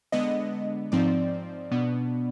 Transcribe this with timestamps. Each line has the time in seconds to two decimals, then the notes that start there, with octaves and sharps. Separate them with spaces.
0.12 D3 G#3 B3 D4 D#5
0.92 G#2 F3 C4 D#4 D5
1.71 B2 B3 D4